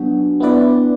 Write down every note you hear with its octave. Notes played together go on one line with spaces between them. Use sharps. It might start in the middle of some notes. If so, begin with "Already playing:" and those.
Already playing: F#3 B3 D4 F#4
B3 E4 B4 D5